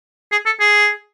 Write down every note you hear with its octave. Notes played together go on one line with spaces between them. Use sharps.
G#4
A4
G#4